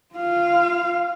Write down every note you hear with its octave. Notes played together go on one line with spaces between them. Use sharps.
F4 F5